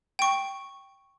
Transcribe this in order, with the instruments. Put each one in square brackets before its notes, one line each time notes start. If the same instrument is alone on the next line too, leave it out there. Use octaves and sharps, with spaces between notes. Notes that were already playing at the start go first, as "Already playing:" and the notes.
[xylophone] G5 C#6